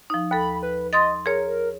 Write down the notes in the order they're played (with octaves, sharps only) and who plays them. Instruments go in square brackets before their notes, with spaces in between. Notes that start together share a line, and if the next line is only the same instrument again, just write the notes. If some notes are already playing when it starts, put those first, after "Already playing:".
[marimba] F3 D#4
[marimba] D#2 A4 [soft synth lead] B5
[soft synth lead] B4
[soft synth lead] D#5 [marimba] C6 D#6 A6
[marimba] G#4 C#5 [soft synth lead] A#4